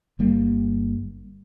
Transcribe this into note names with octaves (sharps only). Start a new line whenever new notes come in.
G1 G3 A#3